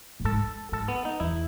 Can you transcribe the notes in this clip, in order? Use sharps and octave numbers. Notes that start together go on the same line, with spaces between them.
A2
G#2 A4
G#2 A4
B3
D#4
E2 E4